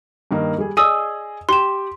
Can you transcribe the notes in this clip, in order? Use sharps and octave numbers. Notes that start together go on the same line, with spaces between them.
G2 D#3 A#3
G3 G#4
G#4 D5 D#5 G#5 D#6 E6
G4 G5 C6 E7